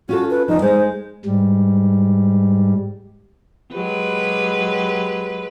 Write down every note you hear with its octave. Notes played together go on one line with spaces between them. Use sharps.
C#4 F4 F#4 A4
B4
E2 F3 D#4
G#3 D#4 C5
G#2 G3
F#3 G#3 G4 B4